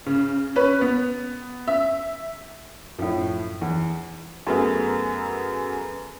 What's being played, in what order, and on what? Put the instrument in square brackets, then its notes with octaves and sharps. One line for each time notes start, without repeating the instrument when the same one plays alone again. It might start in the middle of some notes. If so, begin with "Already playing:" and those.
[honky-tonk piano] C#3
C#4 B4
B3
E5
[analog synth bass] F#2 [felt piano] A2 F3
[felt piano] E2
F#2 A3 B3 G#4 A#4